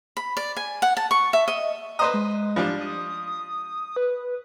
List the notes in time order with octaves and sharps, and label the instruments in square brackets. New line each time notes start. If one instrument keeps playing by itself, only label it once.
[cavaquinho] B5
D5
G#5
F#5
A5
C#6
E5
D#5
[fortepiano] B4 C5 D#5 [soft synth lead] A#5
[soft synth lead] G#3
[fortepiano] F3 G3 D4
[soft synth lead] D#6
B4